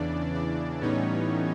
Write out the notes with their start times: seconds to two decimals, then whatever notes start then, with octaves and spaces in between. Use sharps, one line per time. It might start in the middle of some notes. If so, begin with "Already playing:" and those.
Already playing: E2 C#3 E3 D4 D5
0.34 D4 D5
0.81 A2 E3 G3 B3 C#4 D#4 C#5